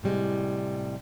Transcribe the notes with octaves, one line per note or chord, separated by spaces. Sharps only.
A2 C3 G3 G#3